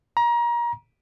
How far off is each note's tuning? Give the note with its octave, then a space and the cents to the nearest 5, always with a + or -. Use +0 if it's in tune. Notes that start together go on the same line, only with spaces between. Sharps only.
A#5 +30